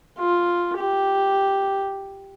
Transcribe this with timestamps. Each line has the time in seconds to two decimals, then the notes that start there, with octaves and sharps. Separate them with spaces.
0.19 F4
0.78 G4